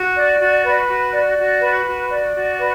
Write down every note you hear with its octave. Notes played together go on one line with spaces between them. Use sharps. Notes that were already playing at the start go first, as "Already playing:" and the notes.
Already playing: F#4
D5
F#4
B4
F#4
D5
F#4
B4
F#4
D5
F#4
B4